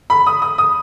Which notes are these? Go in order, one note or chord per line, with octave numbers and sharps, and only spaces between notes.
B5
D#6
D#6
D#6